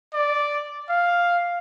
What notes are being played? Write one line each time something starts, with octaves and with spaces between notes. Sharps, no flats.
D5
F5